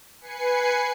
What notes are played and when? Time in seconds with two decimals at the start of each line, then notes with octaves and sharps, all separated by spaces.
0.21 B4 G#5 C7 C#7